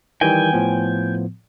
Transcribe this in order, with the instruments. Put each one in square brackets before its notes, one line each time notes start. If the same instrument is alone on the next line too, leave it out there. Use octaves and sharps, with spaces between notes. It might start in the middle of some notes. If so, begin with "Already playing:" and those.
[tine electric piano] D#3 E3 G3 [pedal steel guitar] G5 G#5
[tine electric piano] A2 F3 B3